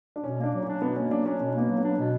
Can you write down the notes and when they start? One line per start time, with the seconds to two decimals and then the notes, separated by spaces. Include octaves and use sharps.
0.16 D4
0.24 B2 C#4
0.38 A#3
0.43 D4
0.53 F#3
0.63 C#4 D4
0.82 B2 B3
0.96 A#3 C#4
1.11 F#3 D4
1.26 C#4 D4
1.40 B2 C#4
1.54 A#3 B3
1.68 F#3
1.78 B3
1.84 D4
1.98 B2 C#4